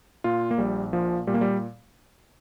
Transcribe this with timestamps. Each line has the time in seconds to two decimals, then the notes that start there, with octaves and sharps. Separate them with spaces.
0.24 A#2 F4
0.51 A#3
0.58 A#1 G3
0.93 A#2 F3
1.27 A#2 G3
1.34 A#3
1.41 G3